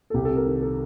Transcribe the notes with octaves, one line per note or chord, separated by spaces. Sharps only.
A4
C2 G4
A4
C3
A#4
D#3
A4